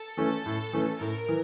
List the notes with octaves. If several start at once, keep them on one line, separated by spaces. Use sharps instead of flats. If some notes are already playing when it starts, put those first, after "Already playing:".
Already playing: A4
E3 A3 C#4
A2
E3 A3 C#4
A2 A#4
E3